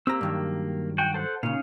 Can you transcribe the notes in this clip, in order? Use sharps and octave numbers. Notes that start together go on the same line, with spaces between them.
A#3 C4 G4 A#5 E6
G2 D#3 F#3
F#4 G5
A4 C5 F#5
A#2 C#3 C#4 D#4 F5